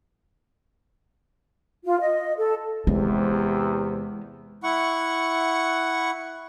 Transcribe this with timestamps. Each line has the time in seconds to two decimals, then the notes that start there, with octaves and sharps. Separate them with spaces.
1.85 F4
2.00 D#5
2.38 A4
2.87 E2 C3 G#3
4.63 E4 F#5 C#6